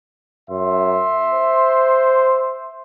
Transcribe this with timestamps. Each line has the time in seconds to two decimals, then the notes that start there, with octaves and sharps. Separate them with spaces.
0.50 F#2 E5 C6
1.34 C5